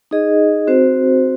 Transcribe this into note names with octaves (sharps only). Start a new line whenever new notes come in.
D#4 G#4 D#5
C4 F#4 C5